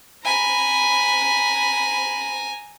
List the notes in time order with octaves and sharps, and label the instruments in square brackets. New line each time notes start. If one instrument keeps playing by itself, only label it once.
[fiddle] G#5 A#5 [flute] B5